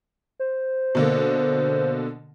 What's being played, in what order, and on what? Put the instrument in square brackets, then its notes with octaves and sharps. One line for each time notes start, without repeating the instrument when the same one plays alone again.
[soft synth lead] C5
[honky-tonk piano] B2 D3 A#3